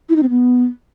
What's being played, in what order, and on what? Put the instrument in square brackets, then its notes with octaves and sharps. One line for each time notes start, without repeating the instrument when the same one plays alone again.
[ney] E4
D#4
C4
B3